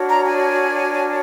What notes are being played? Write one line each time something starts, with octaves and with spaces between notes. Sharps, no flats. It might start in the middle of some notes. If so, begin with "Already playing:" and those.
Already playing: D4 F#4 A#4 C#5
A#5
G#5